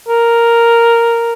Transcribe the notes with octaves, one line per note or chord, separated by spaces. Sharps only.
A#4